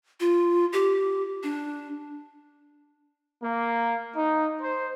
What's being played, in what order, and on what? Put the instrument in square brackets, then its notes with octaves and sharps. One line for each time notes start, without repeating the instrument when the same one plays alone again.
[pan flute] F4
G4
D4
[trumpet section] A#3
D#4
C5